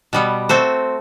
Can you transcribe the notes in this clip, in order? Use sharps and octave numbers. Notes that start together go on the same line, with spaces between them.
B2 G3 B3
A3 C4 F#4 C5